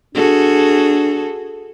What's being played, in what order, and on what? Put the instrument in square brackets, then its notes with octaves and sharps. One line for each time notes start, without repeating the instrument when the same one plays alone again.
[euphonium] D4 [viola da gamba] F#4 G#4 A4